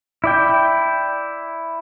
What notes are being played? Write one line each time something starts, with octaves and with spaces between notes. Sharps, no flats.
E4 D5 G5